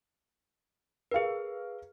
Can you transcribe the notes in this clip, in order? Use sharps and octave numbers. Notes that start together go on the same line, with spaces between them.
G#4 A#4 B4 F5